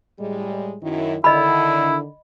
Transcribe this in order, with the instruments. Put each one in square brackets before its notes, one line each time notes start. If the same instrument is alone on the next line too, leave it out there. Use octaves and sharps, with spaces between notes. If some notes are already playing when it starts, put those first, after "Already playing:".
[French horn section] A2 G3 G#3
F#2 D#3 E4
[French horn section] D3 D#3 [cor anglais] E4 [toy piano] D#5 B5